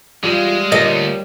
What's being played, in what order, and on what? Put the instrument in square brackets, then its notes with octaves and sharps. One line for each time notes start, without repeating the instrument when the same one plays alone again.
[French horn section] E2 F4 [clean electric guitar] G3 [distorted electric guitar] G#3
[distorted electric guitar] D2 [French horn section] A#3 D4 F4 [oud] D#5